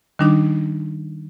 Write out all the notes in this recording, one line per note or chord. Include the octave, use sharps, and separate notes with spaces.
D#3 G3 D4 D#4 D6